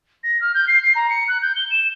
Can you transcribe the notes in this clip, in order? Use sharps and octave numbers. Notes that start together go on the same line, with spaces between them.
A#6
F6
G6
C7
C7
A#5
C#7
F#6
G6
G7
E7